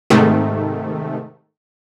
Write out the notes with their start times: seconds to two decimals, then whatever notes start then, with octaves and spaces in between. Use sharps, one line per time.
0.10 G#2 C3 D#3 A3